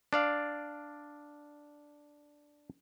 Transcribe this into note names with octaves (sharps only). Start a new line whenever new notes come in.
D4 D5 F5